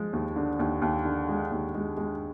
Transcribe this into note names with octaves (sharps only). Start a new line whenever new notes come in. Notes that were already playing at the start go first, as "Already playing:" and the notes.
Already playing: F3 G#3
D#2
D3
D#2
D#2
D3
G#3
D#2
G#3
G#3